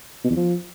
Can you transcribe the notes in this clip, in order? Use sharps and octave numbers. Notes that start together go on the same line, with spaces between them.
B2
E2
F3